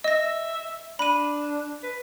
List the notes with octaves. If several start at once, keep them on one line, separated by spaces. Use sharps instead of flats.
D#5 E5 A#6
D4 B5 D#7
B4